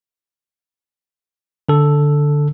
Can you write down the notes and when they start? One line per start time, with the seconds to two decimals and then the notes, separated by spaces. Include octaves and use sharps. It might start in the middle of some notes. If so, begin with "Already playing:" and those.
1.69 D3 A4